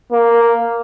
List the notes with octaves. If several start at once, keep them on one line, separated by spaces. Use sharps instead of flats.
A#3